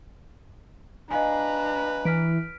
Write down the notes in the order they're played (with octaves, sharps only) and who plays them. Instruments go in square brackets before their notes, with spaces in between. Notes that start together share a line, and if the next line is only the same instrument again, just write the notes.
[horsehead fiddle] D4 A#5 [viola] B4 [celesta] D#5 F5 G#5
[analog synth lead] E3 [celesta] F6 B6 D7